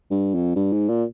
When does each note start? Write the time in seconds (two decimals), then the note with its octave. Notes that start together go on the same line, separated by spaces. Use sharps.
0.11 G2
0.34 F2
0.56 G2
0.72 G#2
0.89 A#2